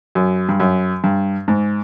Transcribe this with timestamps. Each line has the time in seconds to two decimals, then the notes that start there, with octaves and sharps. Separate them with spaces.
0.15 F#2
0.49 G2
0.60 F#2
1.04 G2
1.48 G#2